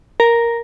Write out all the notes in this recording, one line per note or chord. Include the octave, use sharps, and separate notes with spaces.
A#4